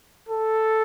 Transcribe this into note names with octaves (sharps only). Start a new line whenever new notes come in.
A4